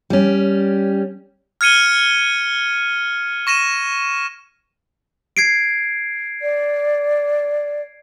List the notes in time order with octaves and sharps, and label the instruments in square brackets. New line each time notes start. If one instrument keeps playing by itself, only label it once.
[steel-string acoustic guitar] G3 C#4
[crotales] F6 G#6 C#7 D#7 G7
C#6 A#6 D#7 E7
[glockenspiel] G#6 C7 D7
[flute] D5